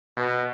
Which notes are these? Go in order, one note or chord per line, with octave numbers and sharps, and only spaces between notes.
B2